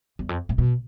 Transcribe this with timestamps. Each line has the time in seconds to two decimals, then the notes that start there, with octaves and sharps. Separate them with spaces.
0.19 E2
0.29 F2
0.49 A2
0.58 B2